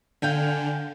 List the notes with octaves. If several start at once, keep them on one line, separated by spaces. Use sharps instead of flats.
D3 F5 G5 G#5